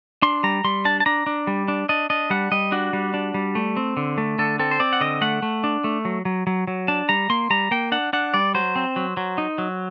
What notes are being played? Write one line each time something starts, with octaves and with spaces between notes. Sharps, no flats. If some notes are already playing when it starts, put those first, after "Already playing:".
D4 C6
G3 A#5
G3 C6
D4 A5
A5
D4 A#5
D4
G3
D4
D4 D#5
D4 D#5
G3 F#5
G3 D#5
D4 F#4
G3
D4
G3
A3
C4
D3
A3
D3 A4
C4 A4
C5
C4 D5
F#5
D3 D#5
A3 F#5
A3
D4
A3
F#3
F#3
F#3
F#3
D4 A5
G3 A#5
A#3 C6
G3 A#5
A#3 G5
D4 F#5
D4 F#5
G3 D5
F#3 C5
C4
F#3
F#3
D#4
F#3